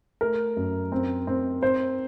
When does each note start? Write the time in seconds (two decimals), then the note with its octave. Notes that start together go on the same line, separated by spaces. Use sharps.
0.21 A3 A#4
0.57 F#2
0.92 C4
1.27 C4
1.62 C4 C5